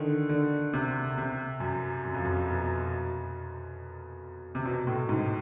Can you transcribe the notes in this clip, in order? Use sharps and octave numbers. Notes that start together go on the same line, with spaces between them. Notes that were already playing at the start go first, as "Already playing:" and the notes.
Already playing: D3 D#3
D3
C3
C3
F#2
F#2
F2
F#2
B2
C3
B2
A2
G#2